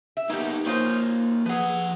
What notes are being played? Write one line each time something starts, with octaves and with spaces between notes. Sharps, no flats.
E5
A#3 B3 D#4 G4
A#3 D#4 F4 C5 C#5
F3 G#4 B4 F#5